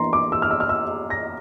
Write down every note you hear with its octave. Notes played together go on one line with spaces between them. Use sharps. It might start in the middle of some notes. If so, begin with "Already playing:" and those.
Already playing: E3 A#3 D4 A#5 C6
D6
E6
F6
E6
F6
E6
A#6